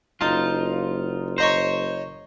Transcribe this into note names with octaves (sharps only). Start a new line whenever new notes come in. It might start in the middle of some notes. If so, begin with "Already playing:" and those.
F#1 D#4 F4 A5
C5 C#5 D#5 A#5